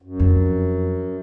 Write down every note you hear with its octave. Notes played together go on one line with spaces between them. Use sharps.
F#2
F2